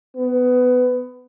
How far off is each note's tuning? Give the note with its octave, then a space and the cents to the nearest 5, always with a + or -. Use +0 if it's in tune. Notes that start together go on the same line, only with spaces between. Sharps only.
B3 +20